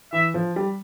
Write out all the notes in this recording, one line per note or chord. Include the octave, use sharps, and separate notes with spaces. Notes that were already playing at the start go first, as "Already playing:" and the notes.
E3 E5
F3
G3